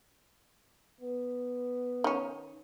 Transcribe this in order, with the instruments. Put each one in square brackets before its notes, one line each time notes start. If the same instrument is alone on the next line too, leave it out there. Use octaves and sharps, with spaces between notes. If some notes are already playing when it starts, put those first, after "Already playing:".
[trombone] B3
[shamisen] D#3 C#4